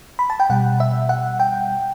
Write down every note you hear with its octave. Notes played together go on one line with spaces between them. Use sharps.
B5
A5
G5
B2 G3 F#5
E5
F#5
G5